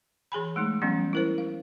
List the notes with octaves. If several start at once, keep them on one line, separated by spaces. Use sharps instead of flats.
E3 G#4 G#5 B5
G#3 A3 D#4
E3 F#3 G3 B3 C#4
E4 A#4 C5
F5